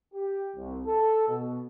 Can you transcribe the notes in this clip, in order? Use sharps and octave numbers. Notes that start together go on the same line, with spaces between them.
G4
C2
A4
B2